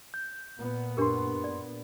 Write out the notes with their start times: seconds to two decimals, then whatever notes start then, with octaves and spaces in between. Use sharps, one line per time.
0.14 G6
0.58 A#2 B3
0.97 F#2 D4 G4 A#4 C6
1.44 D5